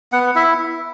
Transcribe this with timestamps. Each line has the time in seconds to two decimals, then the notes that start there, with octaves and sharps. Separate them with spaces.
0.12 B3 F#5
0.35 E4 E5